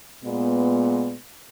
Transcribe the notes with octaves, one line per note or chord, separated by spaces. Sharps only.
A#2 G#3 B3